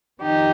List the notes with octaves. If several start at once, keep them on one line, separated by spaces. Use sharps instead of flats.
F2 D#3 G3 D#4 G4